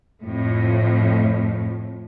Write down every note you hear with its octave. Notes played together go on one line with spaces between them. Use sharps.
F2 A2